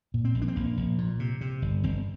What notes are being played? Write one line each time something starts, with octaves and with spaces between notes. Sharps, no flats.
A#2
C4
A#1
D4
C4
A#1 A#3
A#1
A#2
C3
C3
G1
G1 C4